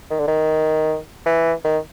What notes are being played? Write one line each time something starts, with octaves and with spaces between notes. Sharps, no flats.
D#3
D3
D#3
E3
D#3